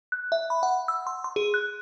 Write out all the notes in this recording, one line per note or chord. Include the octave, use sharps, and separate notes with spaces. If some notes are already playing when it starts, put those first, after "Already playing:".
F#6
E5
B5
F#5
E6
C6
C6
G#4
F#6